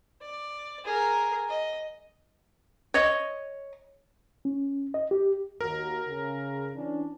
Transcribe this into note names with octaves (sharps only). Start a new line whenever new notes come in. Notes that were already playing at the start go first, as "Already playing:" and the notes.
D5
G#4 A#4
D#5
C#5 D#5
C#4
D#5
G4
D#2 F#4 A#4
C#3
E3 C#4 D4